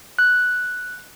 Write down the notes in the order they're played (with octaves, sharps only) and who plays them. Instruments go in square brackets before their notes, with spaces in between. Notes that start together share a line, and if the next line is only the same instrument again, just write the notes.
[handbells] F#6